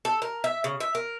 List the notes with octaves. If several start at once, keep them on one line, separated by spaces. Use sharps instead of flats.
A4
A#4
E5
C#3
E5
A#4